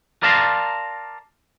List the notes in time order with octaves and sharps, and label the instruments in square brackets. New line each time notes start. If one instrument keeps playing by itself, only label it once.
[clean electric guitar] A#4 D5 F5 A5 A#5 C6